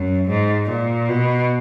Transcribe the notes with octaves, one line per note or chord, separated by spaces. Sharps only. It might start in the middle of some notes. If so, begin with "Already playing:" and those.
Already playing: F#2
G#2
A#2
B2